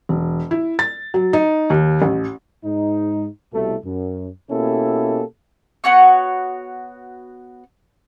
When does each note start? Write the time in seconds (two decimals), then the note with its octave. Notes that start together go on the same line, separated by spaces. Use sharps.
0.09 E1
0.51 E4
0.79 A6
1.14 F#3
1.33 D#4
1.70 D#2
2.02 A1
2.64 G#2 D#4
3.53 C2 B2 A3
3.84 F#2
4.51 B2 A#3 C#4 E4 G4 A4
5.84 B3 F#4 C#5 C#6